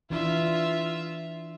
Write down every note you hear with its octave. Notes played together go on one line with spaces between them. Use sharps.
E3 D4 F4 E5